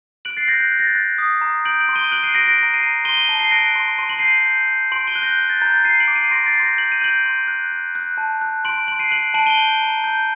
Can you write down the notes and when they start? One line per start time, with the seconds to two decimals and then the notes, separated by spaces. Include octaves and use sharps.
0.25 F#6 D7 F#7
0.37 A6 C7
0.48 F#6 G6 A#6
0.60 G6
0.72 F#6 A6
0.79 A#6
0.87 A6
0.95 F#6
1.18 D#6
1.41 A#5
1.65 G6 D7 F#7
1.80 D7 F#7
1.89 C6
1.95 D#7 G7
2.11 F#6 D7 F#7
2.23 C7 D#7
2.35 F#6 A#6 D7
2.47 A#6 D7
2.58 A#5 A#6 D7
2.74 C7 D#7
2.82 A#5
3.04 C6 D#7 G7
3.17 D#7 G7
3.29 A5
3.39 C7 D#7
3.51 F#6 A#6 D7
3.75 C6
3.98 C6 D#7
4.09 F#7
4.19 G6 C7 D#7
4.45 G6
4.68 G6
4.92 C6 D7 F#7
5.07 D#7 G7
5.15 F#6
5.22 G6 A#6
5.38 F#6
5.50 A6
5.61 A#5 G6
5.73 A6
5.85 G6 C7 D#7
6.00 D7 F#7
6.08 D6
6.15 C7 D#7
6.31 C6 A#6 D7
6.46 A6 C7
6.55 C6
6.62 G6 A#6
6.78 G6 F#7
6.92 D#7
7.02 G6 D7 F#7
7.25 C6
7.48 F#6
7.72 F#6
7.95 F#6
8.18 A5
8.41 F#6
8.65 C6 D7 F#7
8.88 C6 D7 F#7
8.99 C7 D#7
9.11 F#6 D7 F#7
9.34 A5 D7 F#7
9.46 D#7 G7
9.57 G6
9.82 A#5
10.04 G6